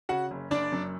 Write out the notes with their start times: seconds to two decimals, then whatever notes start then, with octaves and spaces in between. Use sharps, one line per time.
0.09 C#3 F#4 F#5
0.31 F#1
0.51 F#1 D4 D5
0.72 F#2